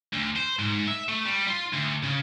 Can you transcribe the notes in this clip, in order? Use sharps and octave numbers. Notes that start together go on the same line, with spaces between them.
D2
C5
G#2
E5
A3
G3
F4
D2
C#3